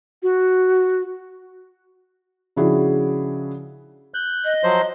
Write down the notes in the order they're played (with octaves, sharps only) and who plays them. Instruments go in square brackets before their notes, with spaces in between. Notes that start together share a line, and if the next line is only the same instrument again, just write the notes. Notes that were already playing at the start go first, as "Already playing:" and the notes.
[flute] F#4
[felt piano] C#3 F3 D4 E4 F#4 G#4
[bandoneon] F#6 G6
[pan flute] D#5
[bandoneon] F3 F#3 C5